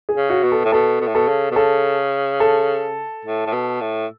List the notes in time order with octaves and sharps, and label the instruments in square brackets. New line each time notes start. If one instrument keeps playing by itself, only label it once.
[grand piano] G#4
[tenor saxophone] C#3
[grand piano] F#4
[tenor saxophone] B2
[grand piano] A4
[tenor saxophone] A2
[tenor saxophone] B2 [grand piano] A4
[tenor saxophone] B2
A2
[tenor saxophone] B2 [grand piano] A4
[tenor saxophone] C#3
B2
[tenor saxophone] C#3 [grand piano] A4
[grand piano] A4
[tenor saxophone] A2
A2
B2
A2